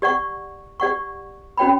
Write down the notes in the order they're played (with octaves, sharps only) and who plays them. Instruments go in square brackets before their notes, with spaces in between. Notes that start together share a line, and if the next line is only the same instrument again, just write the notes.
[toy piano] G4 D5 F#5 C#6
G4 D5 F#5 C#6
C#4 F#4 C#5 G5 B5